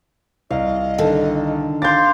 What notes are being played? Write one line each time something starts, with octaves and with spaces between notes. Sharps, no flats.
C2 D#5 F5
D3 D#3 A4
F5 C6 D6 G6 A6